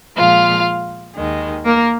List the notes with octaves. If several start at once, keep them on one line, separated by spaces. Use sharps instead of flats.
A#2 F3 G#3 F4 F5
D#2 D#3 G#3
A#3 A#4